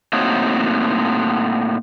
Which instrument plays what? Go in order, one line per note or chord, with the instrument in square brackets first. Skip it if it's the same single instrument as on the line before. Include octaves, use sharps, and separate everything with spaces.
[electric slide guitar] A2 A#3 C4 D#4 F#4 C#5